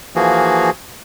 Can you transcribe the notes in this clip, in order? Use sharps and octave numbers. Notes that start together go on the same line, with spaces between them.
E3 F3 A#3 F#4 G#4